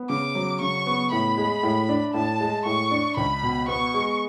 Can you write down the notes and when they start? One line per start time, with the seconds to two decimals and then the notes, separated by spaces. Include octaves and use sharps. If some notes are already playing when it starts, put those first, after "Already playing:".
Already playing: B3
0.09 C#3 D6
0.35 F#3
0.61 C#3 C#6
0.86 B3
1.12 A2 B5
1.37 G#3
1.63 A2
1.89 D4
2.14 A2 A5
2.40 G#3
2.65 A2 C#6
2.91 D4
3.17 C#2 B5
3.43 B2
3.68 B3 C#6
3.94 G#3